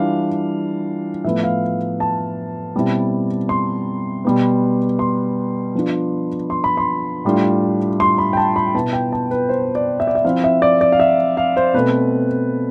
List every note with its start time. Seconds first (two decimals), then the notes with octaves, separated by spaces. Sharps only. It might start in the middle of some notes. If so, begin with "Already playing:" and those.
Already playing: E3 G3 D4 F4 F5
1.25 A2 F3 B3 E5
1.44 F5
2.00 A5
2.75 B2 G3 C4 E4
3.49 C6
4.25 B2 G3 B3
4.99 C6
5.75 F3 B3 D4 F4
6.50 C6
6.64 B5
6.77 C6
7.25 A2 G3 D4 F4
8.00 C6
8.18 B5
8.33 G5
8.37 A5
8.56 B5
8.75 B2 B3 E4 A5
8.93 G5
9.12 A5
9.31 B4
9.49 C5
9.75 D5
10.00 E5
10.07 D5
10.15 E5
10.25 F3 C4 E4 F5
10.44 E5
10.62 D5
10.81 D5
10.92 F5
11.00 E5
11.37 F5
11.57 C5
11.74 B2 A3 C4 B4